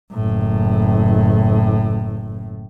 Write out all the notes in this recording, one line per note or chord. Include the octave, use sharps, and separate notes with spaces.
F#1 A2